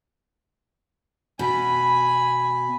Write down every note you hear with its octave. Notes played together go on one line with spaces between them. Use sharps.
B2 G#5 B5